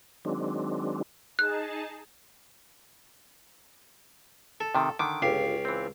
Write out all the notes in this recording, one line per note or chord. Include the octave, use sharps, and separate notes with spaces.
D#3 F#3 G#3 C4 D4
D#4 G#4 A5 F#6
A4
C3 D#3
D3 D#3 D6
G1 C#2 G4 F5
E3 C4